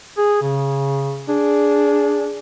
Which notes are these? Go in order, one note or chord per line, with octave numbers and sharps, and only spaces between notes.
G#4
C#3
D4 G#4